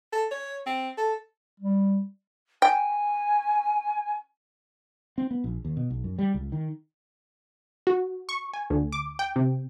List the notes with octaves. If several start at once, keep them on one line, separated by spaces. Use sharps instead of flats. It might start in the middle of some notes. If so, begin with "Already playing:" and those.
A4
C#5
C4
A4
G3
G5 G#5
C4
B3
A#1
D#2
B2
B1
F#2
G3
C#2
D#3
F#4
C#6
G#5
D2
D6
G5
C3